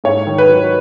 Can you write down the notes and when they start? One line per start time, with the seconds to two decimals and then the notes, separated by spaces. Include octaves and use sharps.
0.04 G#2 C#5
0.27 D#3
0.38 B4
0.49 F#3